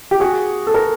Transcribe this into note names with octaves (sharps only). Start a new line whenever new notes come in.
G4
F#4 G#4
A4
A#4